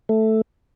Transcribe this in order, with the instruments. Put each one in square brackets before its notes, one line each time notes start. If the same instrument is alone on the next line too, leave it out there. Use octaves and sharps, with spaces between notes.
[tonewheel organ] A3